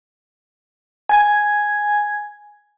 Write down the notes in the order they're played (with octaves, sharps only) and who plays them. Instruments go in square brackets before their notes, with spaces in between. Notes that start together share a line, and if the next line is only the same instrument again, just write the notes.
[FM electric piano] G#5 G#6